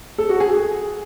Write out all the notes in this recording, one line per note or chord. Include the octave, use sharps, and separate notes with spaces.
A4
F#4
G#4